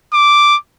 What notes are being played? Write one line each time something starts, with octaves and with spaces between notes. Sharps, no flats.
D6